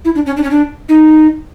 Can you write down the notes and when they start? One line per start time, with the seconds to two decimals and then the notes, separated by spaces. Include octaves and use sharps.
0.05 E4
0.15 D4
0.26 C#4
0.37 D4
0.44 C#4
0.50 D4
0.89 D#4